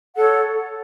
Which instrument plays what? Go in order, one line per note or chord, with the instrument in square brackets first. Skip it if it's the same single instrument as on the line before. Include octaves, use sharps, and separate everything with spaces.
[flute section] A4 C#5 F#5